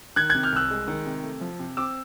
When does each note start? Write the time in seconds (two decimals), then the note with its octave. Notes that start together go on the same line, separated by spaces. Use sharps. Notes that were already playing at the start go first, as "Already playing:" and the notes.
0.16 D#3 F#6 G#6
0.30 F#6 G#6
0.35 C3
0.43 F6 G6
0.52 C2 E6 F#6
0.71 G#3
0.88 D#3
1.06 C3
1.24 A3
1.41 F3
1.59 C3
1.77 C4 D6 E6